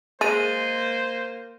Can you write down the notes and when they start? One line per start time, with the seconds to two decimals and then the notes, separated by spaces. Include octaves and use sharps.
0.21 G#3 A#3 C5 C6 A6 D#7